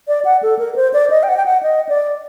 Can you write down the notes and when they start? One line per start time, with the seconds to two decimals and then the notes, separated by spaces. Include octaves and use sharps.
0.08 D5
0.25 F#5
0.43 A4
0.59 A#4
0.73 A#4
0.76 C5
0.94 D5
1.10 D#5
1.23 G5
1.28 F#5
1.37 G5
1.46 F#5
1.63 D#5
1.89 D5